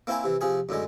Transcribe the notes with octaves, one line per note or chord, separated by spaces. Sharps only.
A#3 C4 E4 C5 G#5 A#5
C3 E3
C3 F3 G#4 G#5
F#2 A2 D3 G#3